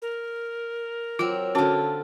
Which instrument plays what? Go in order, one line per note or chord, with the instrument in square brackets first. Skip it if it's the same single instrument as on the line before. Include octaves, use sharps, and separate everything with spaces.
[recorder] A#4
[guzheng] F#3 C4 [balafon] F4
[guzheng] D3 F4 [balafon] C#4 F#4 [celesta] A5